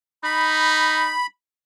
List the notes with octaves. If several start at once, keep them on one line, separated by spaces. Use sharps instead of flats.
D#4 B5